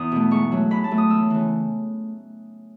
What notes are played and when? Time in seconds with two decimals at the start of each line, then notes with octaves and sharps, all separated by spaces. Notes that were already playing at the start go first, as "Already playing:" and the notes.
Already playing: E2 D#6
0.12 B2 A3
0.31 G#2 C#6
0.52 F#3 A3
0.71 G#2 B5
0.84 A5
0.91 F#3 A3
0.98 D#6
1.10 E2 E6
1.30 C#3 E3